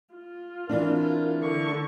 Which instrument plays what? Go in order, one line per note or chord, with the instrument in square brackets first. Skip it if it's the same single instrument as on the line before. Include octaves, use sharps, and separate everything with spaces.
[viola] F4
[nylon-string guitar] E3 C4 D4 [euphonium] A#4
[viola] D3 C#6